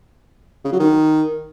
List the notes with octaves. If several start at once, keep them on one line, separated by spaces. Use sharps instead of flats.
C#3
F#3
D#3